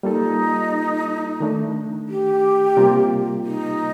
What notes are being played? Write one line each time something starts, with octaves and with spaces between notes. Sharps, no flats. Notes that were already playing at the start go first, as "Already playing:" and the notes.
G3 A#3 D#4 F4 A4
D#3 A3 D4
G4
C3 G3 A#3 F4 A#4
D#4